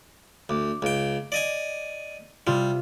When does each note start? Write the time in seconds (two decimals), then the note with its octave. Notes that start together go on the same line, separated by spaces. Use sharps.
0.49 D2 D6
0.82 C#2 G5
1.32 D5 D#5 G#5
2.47 C3 G3 F4